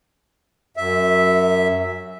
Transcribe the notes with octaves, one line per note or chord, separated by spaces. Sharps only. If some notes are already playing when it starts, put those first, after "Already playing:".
F#2 E5